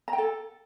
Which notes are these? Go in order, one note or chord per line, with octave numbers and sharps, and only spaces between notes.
A#5
G5
A4